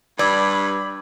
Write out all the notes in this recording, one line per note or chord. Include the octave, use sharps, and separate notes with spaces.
G2 D5 B5 D6 E6 G#6